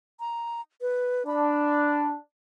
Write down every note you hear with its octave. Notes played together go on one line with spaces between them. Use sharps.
A#5
B4
D4 B5